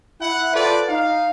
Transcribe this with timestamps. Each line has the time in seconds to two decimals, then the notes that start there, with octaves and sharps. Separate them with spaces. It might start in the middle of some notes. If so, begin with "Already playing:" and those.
0.21 E4 F#5
0.53 F4 A4 B4 C5 D5
0.88 D#4 F5